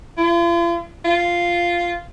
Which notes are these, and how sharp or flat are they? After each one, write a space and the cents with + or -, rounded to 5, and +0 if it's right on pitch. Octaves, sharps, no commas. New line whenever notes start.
F4 -40
F4 -5